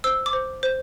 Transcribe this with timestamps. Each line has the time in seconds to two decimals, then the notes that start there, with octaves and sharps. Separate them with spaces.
0.04 C5 E6
0.26 D6
0.33 C5
0.63 C5